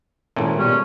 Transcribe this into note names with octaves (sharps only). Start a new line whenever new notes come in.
G#1 A#2 C#4 E4 A4
B2 G3 C#4 D5